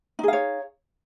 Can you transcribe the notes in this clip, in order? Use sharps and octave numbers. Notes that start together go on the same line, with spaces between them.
D#4 G#4 C#5 F5